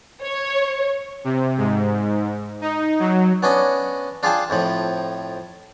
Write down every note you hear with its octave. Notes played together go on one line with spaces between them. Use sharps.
C#5
C3
G#2
D#4
F#3
B3 C#4 D4 D#5
D4 F4 G#4 F5 G5 A5
F2 A2 F3